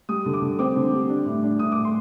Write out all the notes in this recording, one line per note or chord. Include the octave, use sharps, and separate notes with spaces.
G3 D#6
D3
D6
D3
C4 D6
D3
G3
D4
A2
D4
A2 D#6
A2 D6
C6